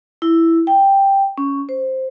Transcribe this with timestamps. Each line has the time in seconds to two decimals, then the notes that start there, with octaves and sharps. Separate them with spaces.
0.22 E4
0.67 G5
1.38 C#4
1.69 C5